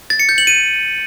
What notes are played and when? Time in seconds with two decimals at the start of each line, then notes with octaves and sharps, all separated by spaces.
0.10 A6
0.20 C#7
0.29 G6
0.38 F#7
0.47 D#7